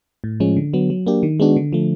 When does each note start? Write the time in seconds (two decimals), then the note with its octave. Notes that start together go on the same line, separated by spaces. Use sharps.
0.24 A2
0.40 F3 G#3 C#4
0.57 D3
0.73 F#3 B3
0.90 F#3
1.07 A#3 D4 G4
1.23 D#3
1.40 G#3 B3 D4 F#4
1.56 D3
1.73 F3 A3